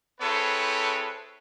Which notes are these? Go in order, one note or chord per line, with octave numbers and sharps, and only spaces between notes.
C4 E4 G#4 A4 B4 C#5